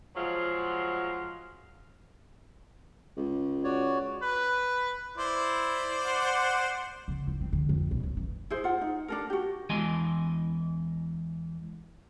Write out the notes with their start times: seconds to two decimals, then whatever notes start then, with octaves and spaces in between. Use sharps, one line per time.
0.16 F3 F#3 G#3 F4
3.17 C#2
3.64 F#4 C#5 D5
4.22 B4
5.18 E4 C5 D5
6.04 F#5
7.08 C#3
7.27 E4
7.41 C4
7.53 D3
7.69 F2
7.91 B1
8.03 G2
8.17 E3
8.50 E4 G#4 C5
8.64 F4 F#5
8.81 D#4
9.08 D4 A4 A#4
9.30 F#4 G4
9.70 E2 E3 G#3 D#5 G#5 C6